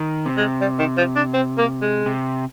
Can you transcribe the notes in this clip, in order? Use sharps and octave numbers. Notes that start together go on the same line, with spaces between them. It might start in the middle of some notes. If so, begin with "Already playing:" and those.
Already playing: D#3
C3
G#3
G3
D#3
F3
D4
C4
A#3
G#3
C3